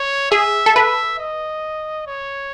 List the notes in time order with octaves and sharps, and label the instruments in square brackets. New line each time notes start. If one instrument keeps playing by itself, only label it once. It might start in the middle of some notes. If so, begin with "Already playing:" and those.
Already playing: [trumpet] C#5
[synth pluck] G#4 [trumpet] E5
[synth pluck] A4
[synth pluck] B4 [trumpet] E5
[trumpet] D#5
C#5